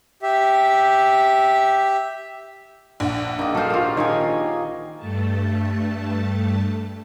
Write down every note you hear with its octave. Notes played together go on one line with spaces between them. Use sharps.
G4 E5
A#1 F#5
D#3 A#3 D#5
F#4 A4 C5 F5
F4 G4 A#4
D#3 C#5 D#5 G#5
G2 A3 A5